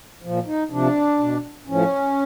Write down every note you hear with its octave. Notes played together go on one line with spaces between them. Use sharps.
A#2 F3
D#4
C3 F3 D4
B2
A2 F3 C#4